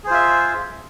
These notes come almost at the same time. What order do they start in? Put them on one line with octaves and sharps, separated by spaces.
G#4 C5 F4 E5